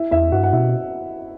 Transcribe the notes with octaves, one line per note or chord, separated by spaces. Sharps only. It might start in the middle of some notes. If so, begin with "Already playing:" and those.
Already playing: E4 E5
E2 E4 E5
G2 F#4 F#5
F#5
B2 E4 E5